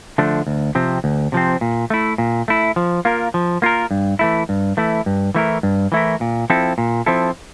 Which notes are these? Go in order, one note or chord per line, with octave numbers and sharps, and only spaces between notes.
D3 F3 A3 D4
D2
C3 F3 C4
D2
C3 F3 C4
A#2
A3 E4
A#2
A3 E4
F3
A#3 F4 A#4
F3
A#3 F4 A#4
G2
E3 A3 E4
G2
E3 A3 E4
G2
E3 A3 E4 A#4
G2
E3 A3 E4 A#4
A#2
F3 C4 E4 A4
A#2
F3 C4 E4 A4